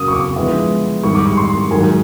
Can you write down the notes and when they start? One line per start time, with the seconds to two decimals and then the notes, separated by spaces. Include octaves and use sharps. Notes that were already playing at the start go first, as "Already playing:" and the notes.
Already playing: F#2 C#3 F#3 A#3 D#6
0.08 C#6
0.13 D6
0.36 D3 F3 G#3 B3 E4
1.04 G#2 D#3 G3 C#6
1.15 D6
1.26 C#6
1.37 C6
1.70 G#2 D#3 F#3 A#3 G#5